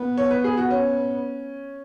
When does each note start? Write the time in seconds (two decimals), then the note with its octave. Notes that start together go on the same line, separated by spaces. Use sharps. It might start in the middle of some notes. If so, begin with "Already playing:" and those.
Already playing: B3
0.17 C#5
0.31 B4
0.44 G#4
0.57 F#4
0.70 C#4